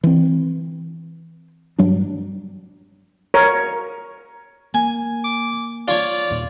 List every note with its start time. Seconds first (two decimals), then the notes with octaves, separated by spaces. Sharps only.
0.04 E3 C4
1.79 G2 F#3 G3 D4
3.34 A#4 C#5
4.74 A#3 G#5
5.24 D6
5.88 F4 C#5 D5
6.31 D#2 A#2